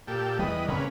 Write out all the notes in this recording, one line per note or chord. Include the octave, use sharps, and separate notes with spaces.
A#2 G4 A4
E2 G3 B4 D#5
C#3 A#3 C4 C#4 B4